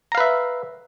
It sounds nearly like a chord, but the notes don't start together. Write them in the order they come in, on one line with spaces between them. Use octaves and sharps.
A#5 F5 B4 E5